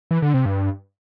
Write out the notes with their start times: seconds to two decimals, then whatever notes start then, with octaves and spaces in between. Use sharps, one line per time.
0.11 E3
0.22 D3
0.34 C3
0.45 G2